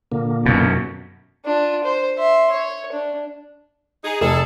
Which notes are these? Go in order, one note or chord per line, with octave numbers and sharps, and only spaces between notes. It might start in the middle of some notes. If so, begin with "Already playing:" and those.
A#2 D3 A#3
F#2 B2
D4 F4
C5
E5 C6
C#5
D4
D#4 G#4
F1 G#4 A4